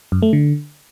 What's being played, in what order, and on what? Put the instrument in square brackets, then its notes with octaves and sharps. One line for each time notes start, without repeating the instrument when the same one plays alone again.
[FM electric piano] F#2
A3
D3